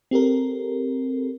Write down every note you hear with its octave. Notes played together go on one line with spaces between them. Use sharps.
C4 G4 A4 A#4